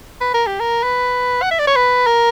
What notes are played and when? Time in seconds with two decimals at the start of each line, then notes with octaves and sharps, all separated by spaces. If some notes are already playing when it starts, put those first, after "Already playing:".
0.21 B4
0.34 A#4
0.47 G4
0.60 A#4
0.83 B4
1.42 F#5
1.51 E5
1.59 D5
1.67 C#5
1.76 B4
2.07 A#4